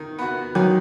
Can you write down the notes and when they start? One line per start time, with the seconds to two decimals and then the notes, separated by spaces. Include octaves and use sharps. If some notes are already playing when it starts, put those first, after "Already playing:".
Already playing: D#3
0.19 B3 F#4
0.55 D#3 F#3